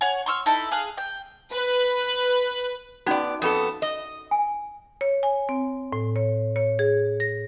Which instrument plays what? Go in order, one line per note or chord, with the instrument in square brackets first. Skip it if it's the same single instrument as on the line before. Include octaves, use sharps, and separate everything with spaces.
[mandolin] C#5 F#5 G#5
C6 C#6 E6 F6
D#4 E4 A4 B4
G#4 F5 F#6
G5
[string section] B4
[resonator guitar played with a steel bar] B3 D5 [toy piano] C#4 D#4 F#4
[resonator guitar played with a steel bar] F2 B3 A4
D#5
[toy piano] G#5
[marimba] C#5
G#5
C4
A2
C#5
C#5
G#4
A#6